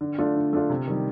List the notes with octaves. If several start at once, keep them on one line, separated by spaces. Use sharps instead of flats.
D3
A3 D4 F4
D3
A3 D4 F4
C3
D#3 G3